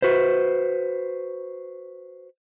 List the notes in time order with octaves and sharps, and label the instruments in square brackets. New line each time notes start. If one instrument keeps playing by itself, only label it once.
[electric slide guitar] F#4 B4 C5